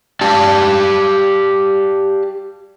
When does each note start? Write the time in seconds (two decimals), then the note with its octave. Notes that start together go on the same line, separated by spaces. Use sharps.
0.21 G4 D5 F5 A5